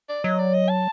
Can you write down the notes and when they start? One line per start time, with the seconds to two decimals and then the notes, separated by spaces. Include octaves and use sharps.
0.09 D5
0.24 F#3 D#5
0.39 D5
0.54 D#5
0.69 A5